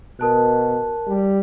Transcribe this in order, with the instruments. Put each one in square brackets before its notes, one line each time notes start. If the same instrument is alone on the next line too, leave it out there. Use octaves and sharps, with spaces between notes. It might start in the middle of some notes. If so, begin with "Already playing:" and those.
[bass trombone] B2 [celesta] A#4 A5 F#6
[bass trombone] G3